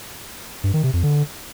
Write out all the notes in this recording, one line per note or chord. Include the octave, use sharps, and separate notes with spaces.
G2
D#3
C3
F2
D3